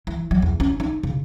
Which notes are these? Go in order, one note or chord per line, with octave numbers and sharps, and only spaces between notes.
E3
F#3
E2
C#4
D#4
C#3